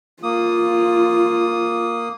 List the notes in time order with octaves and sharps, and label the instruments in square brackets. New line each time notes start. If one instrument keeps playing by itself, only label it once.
[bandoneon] A#3 D#6 [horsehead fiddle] F4